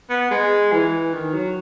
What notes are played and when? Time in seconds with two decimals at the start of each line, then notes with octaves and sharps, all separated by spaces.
0.10 B3
0.31 G#3
0.72 E3
1.13 D#3
1.34 F#3